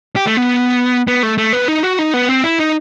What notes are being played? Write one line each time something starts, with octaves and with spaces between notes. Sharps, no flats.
G4
A3
B3
B3
A3
A3
B3
D#4
F#4
D#4
B3
C4
E4
D#4